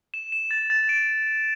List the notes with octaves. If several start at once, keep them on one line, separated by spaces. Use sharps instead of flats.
E7
E7
A6
A6
D7